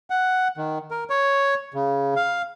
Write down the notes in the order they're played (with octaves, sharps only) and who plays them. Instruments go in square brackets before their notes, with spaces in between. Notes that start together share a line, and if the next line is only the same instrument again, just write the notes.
[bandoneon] F#5
D#3
A#4
C#5
C#3
F5